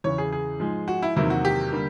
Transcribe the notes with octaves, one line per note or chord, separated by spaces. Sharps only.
E2 C#3 E3 C#5
G#4
G#4
G#2 F3 G#3
F#4
E4
E2 C3 D#3 F#3 A#3 E4
F#4
G4
D3 G3 A#3